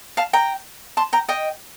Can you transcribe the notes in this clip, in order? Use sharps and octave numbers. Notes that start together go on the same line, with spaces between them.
F5 A5
G5 A#5
A5 C6
G5 A#5
D#5 G5